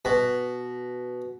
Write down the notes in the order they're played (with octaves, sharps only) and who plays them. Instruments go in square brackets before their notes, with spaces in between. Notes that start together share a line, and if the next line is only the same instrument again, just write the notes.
[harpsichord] B2